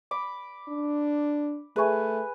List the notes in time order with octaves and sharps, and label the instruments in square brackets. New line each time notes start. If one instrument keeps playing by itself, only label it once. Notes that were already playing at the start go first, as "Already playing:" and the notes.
[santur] B5 D6
[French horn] D4
[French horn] A3 [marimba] G#4 E5 C#6 [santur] B4 G#5